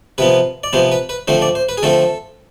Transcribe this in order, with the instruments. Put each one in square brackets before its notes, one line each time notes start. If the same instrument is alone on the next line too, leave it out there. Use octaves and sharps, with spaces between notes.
[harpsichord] C3 F3 B3 B4
D5
C3 F3 B3 C5
B4
B4
D3 F3 A3 C4 C5
D5
C5
B4
G#4
D3 F3 A3 C4 A4